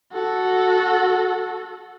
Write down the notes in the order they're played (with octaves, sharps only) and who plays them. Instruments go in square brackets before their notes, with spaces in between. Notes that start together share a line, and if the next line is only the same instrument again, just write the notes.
[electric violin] F#4 A4